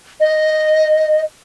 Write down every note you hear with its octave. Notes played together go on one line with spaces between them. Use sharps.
D#5